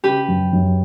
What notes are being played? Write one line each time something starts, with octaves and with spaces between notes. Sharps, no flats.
C#3 G4 B4
F#2
F#2